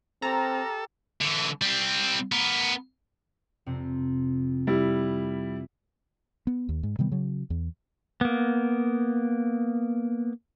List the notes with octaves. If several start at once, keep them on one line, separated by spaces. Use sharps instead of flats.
C4 G4 A4 A#4 A#5
D3 E3
G3 C4
B3 A#4
F2 C3 C4
G3 E4
B3
D#2
G#2
C3 D#3 G3 B3
C#3 F#3
E2
A#3 B3